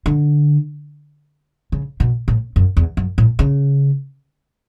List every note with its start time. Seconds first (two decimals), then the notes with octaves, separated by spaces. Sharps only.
0.06 D3
1.72 C#3
2.00 B2
2.28 A2
2.56 F#2
2.77 E2
2.97 F#2
3.18 A2
3.39 C#3